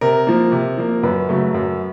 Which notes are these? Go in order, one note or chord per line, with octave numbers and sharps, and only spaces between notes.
C3 A#4
F3 A#3
C3
F3 A#3
F#2 B4
C#3 F#3 A3
F#2